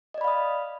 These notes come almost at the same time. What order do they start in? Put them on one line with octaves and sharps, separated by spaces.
D#5 D5 B5 F5 D#6